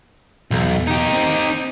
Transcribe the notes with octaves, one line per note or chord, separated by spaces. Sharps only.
B1 E2
D#4 G4
C4